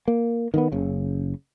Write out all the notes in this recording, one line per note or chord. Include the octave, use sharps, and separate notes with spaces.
A#3
D#3 A#3 B3
F#1 C#3